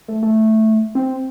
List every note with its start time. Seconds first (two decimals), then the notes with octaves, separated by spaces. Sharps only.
0.08 A3
0.23 A3
0.95 C4